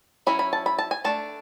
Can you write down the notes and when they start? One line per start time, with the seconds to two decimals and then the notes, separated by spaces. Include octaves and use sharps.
0.27 F#3 C#4 E4 B5
0.39 B5
0.53 A5
0.66 B5
0.79 A5
0.91 G#5
1.04 A3 D4 A5